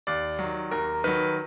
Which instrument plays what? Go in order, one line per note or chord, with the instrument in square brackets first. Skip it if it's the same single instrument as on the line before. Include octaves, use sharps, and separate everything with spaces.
[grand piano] D#2 D5
D#3 F#3
D#2 A#4
D#3 F#3 B4